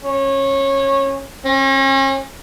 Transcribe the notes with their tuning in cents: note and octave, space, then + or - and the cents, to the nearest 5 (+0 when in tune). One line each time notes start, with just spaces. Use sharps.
C#4 -20
C#4 -40